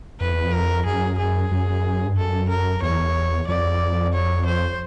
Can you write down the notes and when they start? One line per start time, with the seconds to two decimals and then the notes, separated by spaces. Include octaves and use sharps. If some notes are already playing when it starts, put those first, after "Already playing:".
0.20 F2 B4
0.32 E2
0.44 F2
0.52 A#4
0.86 F#2 G#4
1.19 G#4
1.51 F#2
2.05 G2
2.17 F#2 A4
2.49 A#4
2.82 E2 C#5
3.47 F2 D5
4.14 C#5
4.46 C5